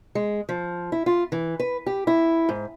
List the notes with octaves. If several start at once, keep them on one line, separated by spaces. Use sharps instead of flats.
G#3
F3
E4
F4
E3
B4
G4
E4
G#2